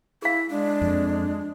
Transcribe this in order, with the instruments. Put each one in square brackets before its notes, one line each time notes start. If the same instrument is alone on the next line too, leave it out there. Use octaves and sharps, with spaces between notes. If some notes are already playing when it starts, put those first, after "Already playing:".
[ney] E4 [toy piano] G#4 F5
[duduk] G#3 [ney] D4
[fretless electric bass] F2